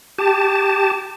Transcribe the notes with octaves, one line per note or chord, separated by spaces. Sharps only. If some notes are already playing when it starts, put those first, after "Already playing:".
G4 A5